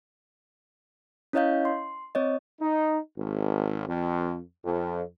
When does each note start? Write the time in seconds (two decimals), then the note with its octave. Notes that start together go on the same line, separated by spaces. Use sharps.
1.33 C#4 E4 C#5 D#5 F5 G6
1.65 C6
2.15 C4 C#5 D#5
2.61 D#4
3.18 G#1
3.88 F2
4.65 F2